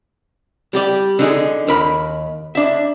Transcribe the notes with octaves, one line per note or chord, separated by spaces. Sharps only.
G3 G4 D5
D3 D#4 G#4
D#2 A#4 B5
D4 E5